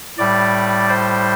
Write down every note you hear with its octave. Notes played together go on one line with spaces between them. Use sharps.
A2 G3 D5
C5